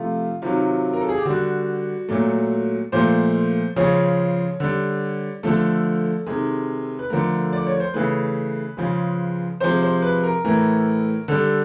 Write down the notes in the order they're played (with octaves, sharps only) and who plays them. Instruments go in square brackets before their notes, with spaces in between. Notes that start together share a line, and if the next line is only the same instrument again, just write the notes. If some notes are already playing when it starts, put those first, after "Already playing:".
Already playing: [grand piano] C3 F3 A3 F4
C3 D#3 F#3 F4
A#4
A4
G#4
G4
D3 G3 F#4
A#2 F#3 A3
A#2 F3 A3 C5
C#3 F3 G#3 C#5
D3 G3
D3 F3 A3 A4
C3 D#3 G#3
B4
D3 F3 A3 A#4
D5
C#5
C5
C#3 E3 A3 B4
C#3 F3 G#3
C3 F3 G#3 C5
C5
B4
A#4
A2 E3 A3 A#4
D3 G3 A4